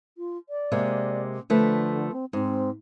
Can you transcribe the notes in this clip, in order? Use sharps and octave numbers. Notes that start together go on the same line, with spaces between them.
F4
D5
C3 G#3 A#3
D3 F3 A3 B4
C4
G#2 C4